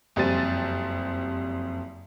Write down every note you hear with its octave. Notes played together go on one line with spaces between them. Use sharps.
F#1 F2 G3 C5 A6 D#7